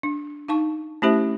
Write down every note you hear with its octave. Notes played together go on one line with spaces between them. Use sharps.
D4
D#4 F5 A5 C#6
A3 C#4 E4 G4 C5 E5